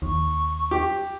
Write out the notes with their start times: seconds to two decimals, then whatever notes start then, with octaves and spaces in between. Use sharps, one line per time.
0.02 D#2 C#6
0.71 G4